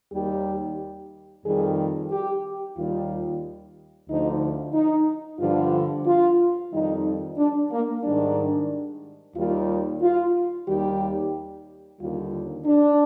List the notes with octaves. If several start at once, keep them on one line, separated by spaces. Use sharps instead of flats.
D#2 D#3 G3 G4
F2 D#3 G3 G#4
G4
D#2 D#3 G3 F4
D2 D3 F3 D#4
D#4
G2 D3 F3 F4
F4
F2 D#3 G3 D#4
D4
A#3
G#2 D#3 G3 D4
D#2 D#3 G3 F4
F4
D#2 D#3 G3 G4
D#2 D3 G3 F4
D4